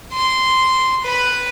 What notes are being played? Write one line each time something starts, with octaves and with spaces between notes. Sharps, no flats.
C6
B4 B5